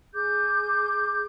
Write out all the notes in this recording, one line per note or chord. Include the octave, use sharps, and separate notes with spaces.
G#4 D6 G6